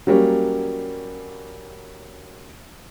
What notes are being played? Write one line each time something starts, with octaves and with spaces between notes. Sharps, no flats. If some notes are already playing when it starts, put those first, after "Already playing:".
F#3 G3 A#3 C#4